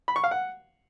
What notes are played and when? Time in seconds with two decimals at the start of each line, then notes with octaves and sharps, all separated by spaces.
0.08 B5
0.16 C#6
0.24 F5
0.31 F#5